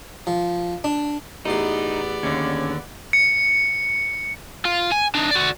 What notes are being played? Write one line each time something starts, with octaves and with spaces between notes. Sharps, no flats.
F3
D4
A1 E2 B3 D#4 D5 C6
D#2 D3 C#4
C#7
F4
G#5
D4 D#4
F#4 D5